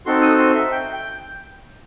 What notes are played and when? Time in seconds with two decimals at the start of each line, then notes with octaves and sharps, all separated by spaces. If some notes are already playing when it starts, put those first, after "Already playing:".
0.06 C4 D#4 F#4 A4 C6
0.22 D#6
0.39 C6
0.55 E5
0.72 G5
0.93 G5